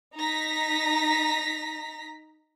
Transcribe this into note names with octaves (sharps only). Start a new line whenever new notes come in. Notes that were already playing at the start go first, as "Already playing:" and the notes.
D#4 A#5 A#6 B6